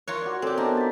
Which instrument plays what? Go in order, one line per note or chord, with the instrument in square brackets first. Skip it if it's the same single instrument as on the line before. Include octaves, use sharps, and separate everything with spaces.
[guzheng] F4 A#4 C#5 [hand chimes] F#6 G#6
[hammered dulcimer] F#4 D5
[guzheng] C4 G4 [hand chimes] A4 C#5 D5 [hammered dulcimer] G#5
[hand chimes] B3 [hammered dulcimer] D4 D#4 [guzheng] A#4
[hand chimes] A6 B6